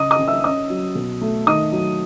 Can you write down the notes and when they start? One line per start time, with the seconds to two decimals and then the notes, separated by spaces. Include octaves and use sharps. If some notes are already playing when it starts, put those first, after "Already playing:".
Already playing: C#3 D#5 D#6
0.11 D#5 D#6
0.19 C#3
0.28 E5 E6
0.44 C#4 D#5 D#6
0.70 F#3
0.95 B2
1.21 A3
1.47 D#3 D#5 D#6
1.72 F#3